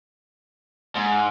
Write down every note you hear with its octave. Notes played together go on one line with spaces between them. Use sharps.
G#2